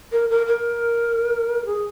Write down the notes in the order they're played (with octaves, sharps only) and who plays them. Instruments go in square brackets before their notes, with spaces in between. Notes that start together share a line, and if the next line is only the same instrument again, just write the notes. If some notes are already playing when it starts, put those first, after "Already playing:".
[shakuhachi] A#4
A#4
A#4
G#4